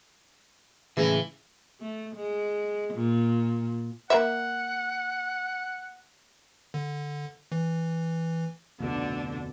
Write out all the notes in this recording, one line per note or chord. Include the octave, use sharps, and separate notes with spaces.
A2 C#3 E3 G#3 E4
A3
G#3
A#2
A#3 E5 F#5
D3
E3
F1 D2 B2 D3 D4